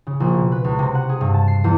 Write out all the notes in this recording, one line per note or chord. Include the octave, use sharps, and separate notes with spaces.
C#3
A#1
B2
B4
C#2
C3
F#5
G#4
G2
A5
C7
E2